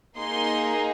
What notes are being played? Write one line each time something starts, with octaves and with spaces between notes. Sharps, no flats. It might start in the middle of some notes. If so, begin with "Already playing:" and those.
A#3 D#4 G#4 C6